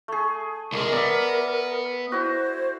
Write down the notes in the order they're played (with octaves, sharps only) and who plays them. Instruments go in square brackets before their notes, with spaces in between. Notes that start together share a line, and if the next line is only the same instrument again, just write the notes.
[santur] A3 G#4
[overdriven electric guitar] C2 G#3 [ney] A#4
[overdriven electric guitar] B3 [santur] D5 E5
[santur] E4 F#4 [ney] C5